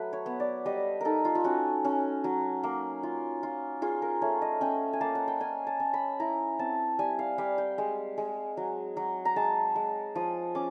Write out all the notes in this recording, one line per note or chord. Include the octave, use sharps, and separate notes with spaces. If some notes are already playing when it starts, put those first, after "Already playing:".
Already playing: F#3 A3 B4
C#5
B3
D5
G3 D#5
D#4 A4 A#4
F4
F4
C#4 F#4
C#4
F#3
A#3
F4
F4
F4 G#4
A#4
A3 C#5
D#5
C#4 G5
G#5
A#3 A5
F#5
G5
C#4 G#5
A5
C#4
B5
E4 A#5
C4 A5
G3 G#5
F5
G3 F5
G5
G#3
G#3
F#3
F#3
A#5
G#3 A5
G#3
F3 D#6
C#4 D6